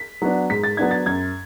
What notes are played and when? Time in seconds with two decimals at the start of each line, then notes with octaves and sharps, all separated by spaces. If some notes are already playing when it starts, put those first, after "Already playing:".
Already playing: B6
0.22 F#3 B3 D4
0.50 G#2 B6
0.64 A6
0.77 F#3 B3 D4 G#6
0.91 A6
1.06 F#2 G#6